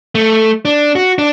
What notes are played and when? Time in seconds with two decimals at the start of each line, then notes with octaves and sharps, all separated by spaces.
0.15 A3
0.65 D4
0.96 F#4
1.18 D4